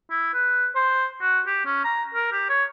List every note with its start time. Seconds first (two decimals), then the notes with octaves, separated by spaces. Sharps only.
0.10 E4
0.33 B4
0.75 C5
1.21 F#4
1.47 G4
1.66 C#4
1.84 A#5
2.14 A#4
2.32 G4
2.49 C#5